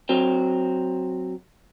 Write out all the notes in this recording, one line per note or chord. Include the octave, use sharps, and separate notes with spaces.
F#3 C4